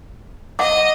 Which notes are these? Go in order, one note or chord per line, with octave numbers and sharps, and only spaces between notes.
D#5 F#5 D6